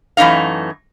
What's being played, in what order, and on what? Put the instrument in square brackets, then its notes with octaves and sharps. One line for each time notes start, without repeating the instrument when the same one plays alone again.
[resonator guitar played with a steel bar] F#2 E3 A3 C#4 D#4 F5